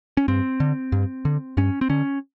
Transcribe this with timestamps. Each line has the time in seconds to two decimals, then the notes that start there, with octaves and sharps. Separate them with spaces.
0.17 C#4
0.28 G2 C4
0.60 D3
0.92 G2
1.25 D3
1.57 G2 C#4
1.81 C4
1.89 D3 C#4